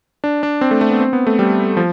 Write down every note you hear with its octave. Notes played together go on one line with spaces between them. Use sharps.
D4
D4
C4
A3
A3
B3
C4
B3
A3
G3
F3